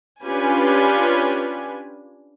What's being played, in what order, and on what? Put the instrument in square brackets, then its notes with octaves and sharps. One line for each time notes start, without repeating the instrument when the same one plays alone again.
[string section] C#4 D4 F4 G4 B4 G#5